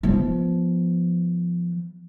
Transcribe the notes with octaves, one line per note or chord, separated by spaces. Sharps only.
F3 B3